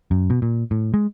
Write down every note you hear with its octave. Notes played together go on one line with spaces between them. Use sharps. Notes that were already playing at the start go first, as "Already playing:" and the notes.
F#2
B2
A#2
A2
G#3